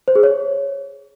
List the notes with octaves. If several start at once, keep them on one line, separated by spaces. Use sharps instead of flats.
C5
G#4
C#5